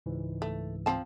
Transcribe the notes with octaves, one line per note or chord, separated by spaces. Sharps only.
C#2 G#2 E3
A3
F3 C4 A5